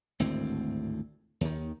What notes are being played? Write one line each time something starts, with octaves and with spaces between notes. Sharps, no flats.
G#1 D2 A2 C4
D#2 D#3